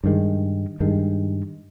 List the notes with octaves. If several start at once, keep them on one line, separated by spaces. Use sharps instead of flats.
G2 D#3 G#3
G2 D#3 G#3